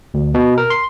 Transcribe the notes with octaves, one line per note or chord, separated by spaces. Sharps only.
D2
B2
A#4
C6